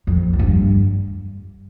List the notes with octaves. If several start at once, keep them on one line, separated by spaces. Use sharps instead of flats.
F2
F2
G2